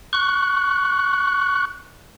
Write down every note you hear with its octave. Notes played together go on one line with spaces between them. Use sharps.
C#6 F#6